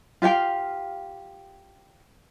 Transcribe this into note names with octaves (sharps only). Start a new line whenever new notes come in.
F4 G4 F5 G5